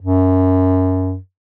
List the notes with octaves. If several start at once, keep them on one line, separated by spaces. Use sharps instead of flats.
F#2